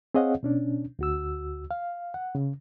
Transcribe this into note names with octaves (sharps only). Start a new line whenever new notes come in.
C4 G#4 C#5 D#5 F5 F#5
B2 C#4 D4
D2 F#4 E6
F5
F#5
C#3